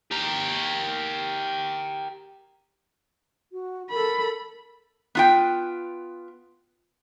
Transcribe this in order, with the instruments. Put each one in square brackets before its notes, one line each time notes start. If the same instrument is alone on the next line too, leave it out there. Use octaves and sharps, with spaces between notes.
[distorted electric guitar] G4 A#4
[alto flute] F#4
[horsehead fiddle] A4 B5 [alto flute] A#4
[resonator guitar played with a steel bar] B3 F4 G5